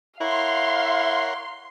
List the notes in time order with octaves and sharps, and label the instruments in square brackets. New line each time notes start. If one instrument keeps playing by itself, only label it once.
[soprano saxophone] E4 [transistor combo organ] A#4 C#5 F#5 [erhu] F5 [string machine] C6